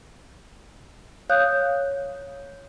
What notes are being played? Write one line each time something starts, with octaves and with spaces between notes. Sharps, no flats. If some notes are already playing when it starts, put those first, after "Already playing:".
C#5 F5 D#6 F#6 G6